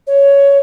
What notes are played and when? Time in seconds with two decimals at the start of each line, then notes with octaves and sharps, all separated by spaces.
0.07 C#5